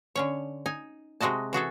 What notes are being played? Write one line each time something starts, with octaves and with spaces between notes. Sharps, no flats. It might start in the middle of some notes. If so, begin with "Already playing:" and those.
D3 C#4 C#5
D#4 G#5
C3 G#3 F#4 D#5 A5
E3 F#4 G#4 A4